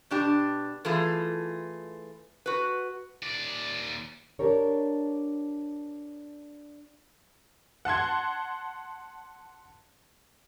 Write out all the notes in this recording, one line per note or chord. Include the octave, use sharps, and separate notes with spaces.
B2 D4 G4
E3 A3 F4 G#4
F#4 B4
D#2 D5
D4 G4 A#4 C#5
F#5 A5 C6 G#6